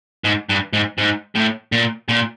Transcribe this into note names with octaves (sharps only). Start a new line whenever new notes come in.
G#2
G2
G#2
G#2
A2
A#2
A#2